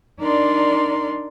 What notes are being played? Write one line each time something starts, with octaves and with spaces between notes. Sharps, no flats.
D4 D#4 A#4 D5 C6